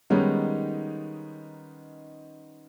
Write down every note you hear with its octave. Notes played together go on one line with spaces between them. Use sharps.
D#3 G3 G#3 B3 C#4 D#4